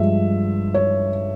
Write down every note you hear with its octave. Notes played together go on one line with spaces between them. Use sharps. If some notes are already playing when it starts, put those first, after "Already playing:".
Already playing: G2 F3 G#3 E5
C#5